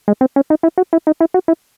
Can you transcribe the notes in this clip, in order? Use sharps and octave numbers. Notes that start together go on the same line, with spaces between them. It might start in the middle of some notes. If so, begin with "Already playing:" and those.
G#3
C4
C#4
D#4
E4
F#4
E4
D#4
E4
F#4
E4